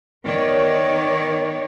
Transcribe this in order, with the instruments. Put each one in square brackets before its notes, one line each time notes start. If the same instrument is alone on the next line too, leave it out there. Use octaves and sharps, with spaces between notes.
[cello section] D#3 B3 C#5 D5